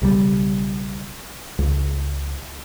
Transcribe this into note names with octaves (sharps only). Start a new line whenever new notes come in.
B1 C#3 E3 G3
C#2